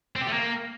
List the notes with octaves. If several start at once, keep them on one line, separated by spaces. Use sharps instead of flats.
C4
G4
A3
A#3